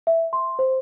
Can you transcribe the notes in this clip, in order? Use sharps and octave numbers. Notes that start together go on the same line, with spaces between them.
E5
C6
C5